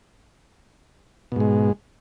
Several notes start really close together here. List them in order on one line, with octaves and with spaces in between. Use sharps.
B2 G#2 G#3